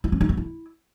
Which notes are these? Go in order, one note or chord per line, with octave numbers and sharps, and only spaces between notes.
E4
C#4
D#4
B3
E4